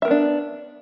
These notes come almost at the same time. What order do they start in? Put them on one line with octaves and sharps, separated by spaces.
E5 A#4 B3 D4